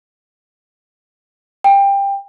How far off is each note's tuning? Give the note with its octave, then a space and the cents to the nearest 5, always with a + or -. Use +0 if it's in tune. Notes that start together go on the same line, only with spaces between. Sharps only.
G5 +20